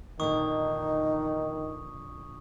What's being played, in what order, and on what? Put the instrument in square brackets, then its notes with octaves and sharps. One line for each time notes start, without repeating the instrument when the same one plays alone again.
[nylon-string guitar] F2 A#2 D3 [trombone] D#3 [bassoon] D#4 [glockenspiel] C#6 D#6